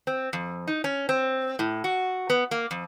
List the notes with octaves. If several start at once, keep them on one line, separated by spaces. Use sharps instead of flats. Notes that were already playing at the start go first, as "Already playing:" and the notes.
C4
F2
D#4
C#4
C4
A2
F#4
B3
A#3
F2